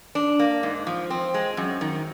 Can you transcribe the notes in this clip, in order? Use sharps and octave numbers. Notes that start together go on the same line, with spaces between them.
D4
A#3
G#2
F3
C4
G#3
F#2
D#3